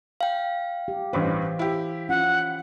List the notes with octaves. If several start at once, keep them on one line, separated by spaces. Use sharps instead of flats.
F5 G5
G4
A1 G2 E3 B4 C5
E4 G4
C#4 F4 F#5